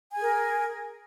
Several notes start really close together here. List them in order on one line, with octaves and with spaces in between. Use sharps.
G#5 G#4 A#4